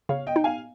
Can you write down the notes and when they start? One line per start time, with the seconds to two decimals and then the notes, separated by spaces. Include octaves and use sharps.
0.09 C#3 C#5 F5
0.27 D#5 G5
0.36 D#4
0.44 F5 G#5